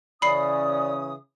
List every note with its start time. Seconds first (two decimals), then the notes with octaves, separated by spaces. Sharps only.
0.22 C#3 E3 C#4 D5 B5 D#6 C7